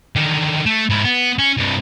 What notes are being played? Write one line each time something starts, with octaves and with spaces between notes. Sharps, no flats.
D3 D#3
A3
G#2 E4
B3
C#4
G2 C3